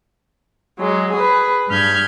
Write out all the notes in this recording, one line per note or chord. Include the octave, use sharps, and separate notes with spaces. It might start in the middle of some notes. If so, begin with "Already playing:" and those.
F#3 G#3
G#4 B4
G2 B5 F6 G6 G#6